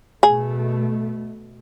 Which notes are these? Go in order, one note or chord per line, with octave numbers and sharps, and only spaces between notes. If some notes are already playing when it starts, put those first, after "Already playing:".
B2 A3 G#4